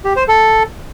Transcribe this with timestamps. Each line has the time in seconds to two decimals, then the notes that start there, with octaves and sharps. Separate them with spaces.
0.05 G4
0.16 C5
0.28 A4